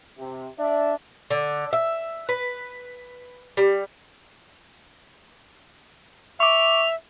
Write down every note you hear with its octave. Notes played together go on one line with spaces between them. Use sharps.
C3
D4 D5 E5
D3
E5
B4
G3
E5 C#6 D6 F7